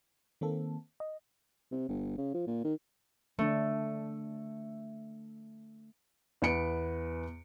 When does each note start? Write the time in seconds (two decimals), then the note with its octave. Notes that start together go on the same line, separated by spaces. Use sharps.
0.41 D#3 A#3 C4 A4
1.00 D#5
1.72 C3
1.89 G1
2.17 C#3
2.34 F3
2.47 A#2
2.64 D#3
3.39 D3 A3 D4
6.42 E2 B3 B4 C#7 D7